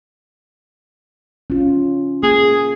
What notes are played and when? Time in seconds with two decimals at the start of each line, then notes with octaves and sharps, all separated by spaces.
1.50 C#4 F4
2.23 A#3 G#4